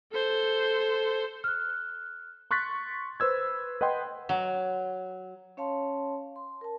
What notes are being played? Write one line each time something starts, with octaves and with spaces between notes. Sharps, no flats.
A4 C5
F6 F#6
C6 C#6 F#6 A6 B6
B4 C5 E6 G#6
B4 D#5 F#5 G5 C6
F#3
C#4 C#5 F5 A5 C6
C6
A#4 A5